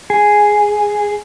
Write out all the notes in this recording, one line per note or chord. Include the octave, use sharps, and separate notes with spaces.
G#4